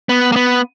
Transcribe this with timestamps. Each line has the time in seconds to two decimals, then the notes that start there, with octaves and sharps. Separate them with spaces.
0.09 B3
0.32 A#3
0.36 B3